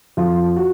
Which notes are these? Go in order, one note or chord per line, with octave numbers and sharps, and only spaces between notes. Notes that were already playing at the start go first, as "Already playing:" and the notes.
F2 F4
F#4